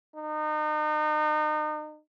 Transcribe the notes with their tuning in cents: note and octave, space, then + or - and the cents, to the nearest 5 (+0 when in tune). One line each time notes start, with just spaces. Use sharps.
D#4 -35